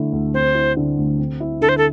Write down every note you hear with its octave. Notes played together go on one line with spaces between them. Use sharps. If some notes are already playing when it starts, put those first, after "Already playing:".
Already playing: D3 A3 E4
D2
C4 C5
E4
D3
D2
C4
E4
D3 A4
C5
A4